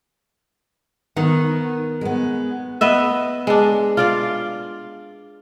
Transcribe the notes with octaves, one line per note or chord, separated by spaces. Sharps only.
D#3 B3
G#3 B3
B3 D#5 E5
G#3 D4
F4 D5 F5